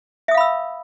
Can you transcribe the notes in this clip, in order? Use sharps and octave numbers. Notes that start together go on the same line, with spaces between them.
E5 F5 B5 D#6 E6